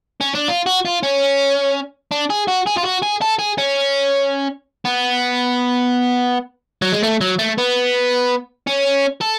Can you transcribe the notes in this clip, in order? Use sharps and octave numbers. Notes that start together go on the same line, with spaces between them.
C#4
D4
F4
F#4
F4
C#4
D4
G#4
F#4
G#4
F4
F#4
G#4
A4
G#4
C#4
B3
F#3
G#3
A3
F#3
A3
B3
C#4
A4